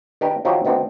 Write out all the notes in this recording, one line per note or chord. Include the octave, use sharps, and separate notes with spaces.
D#3 D4 G4 A#4 B4
D#3 F3 F#3 D#4 G4 C5
D2 D#3 B3 C4 D4